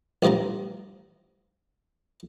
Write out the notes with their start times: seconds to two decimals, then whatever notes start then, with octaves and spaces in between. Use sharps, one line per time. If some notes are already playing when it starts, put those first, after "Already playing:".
0.23 A1 G2 F3 G3 A#5